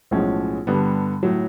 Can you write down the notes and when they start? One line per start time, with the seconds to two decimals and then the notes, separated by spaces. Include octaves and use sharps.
0.11 B1 A2 F3 G#3 C#4
0.67 G2 D3 G3 B3
1.23 A2 F#3